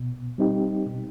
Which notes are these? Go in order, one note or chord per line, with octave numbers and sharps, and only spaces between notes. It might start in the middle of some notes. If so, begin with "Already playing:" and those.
Already playing: B2
G3 C4 D#4 G4
B2